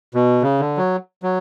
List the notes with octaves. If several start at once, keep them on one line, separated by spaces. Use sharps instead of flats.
B2
C#3
D3
F#3
F#3